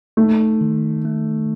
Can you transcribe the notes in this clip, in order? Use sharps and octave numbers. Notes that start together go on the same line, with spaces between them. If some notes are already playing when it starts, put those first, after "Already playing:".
A3 D#4
D#3
A3